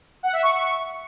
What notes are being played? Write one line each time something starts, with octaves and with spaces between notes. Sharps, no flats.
F#5
E5
C#6